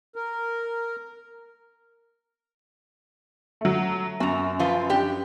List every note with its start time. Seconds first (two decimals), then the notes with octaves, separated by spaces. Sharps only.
0.16 A#4
3.61 F#3 A3
4.20 F#2 F#4 A#5
4.59 F3 F4 B4
4.90 D4 G4